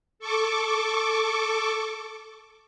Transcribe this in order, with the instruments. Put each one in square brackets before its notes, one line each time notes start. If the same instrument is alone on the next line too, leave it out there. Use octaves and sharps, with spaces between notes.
[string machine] A4 C#6 D6